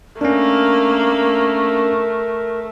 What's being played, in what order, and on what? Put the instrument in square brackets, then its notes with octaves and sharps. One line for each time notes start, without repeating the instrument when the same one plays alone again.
[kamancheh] A3 [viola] A#3 [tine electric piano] C#4 D4 [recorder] A#4